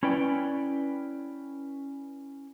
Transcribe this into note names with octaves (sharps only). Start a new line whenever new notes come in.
C#4 E4 B4 D5 G5